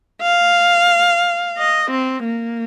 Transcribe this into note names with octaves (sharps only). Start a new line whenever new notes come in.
F5
D#5
C4
A#3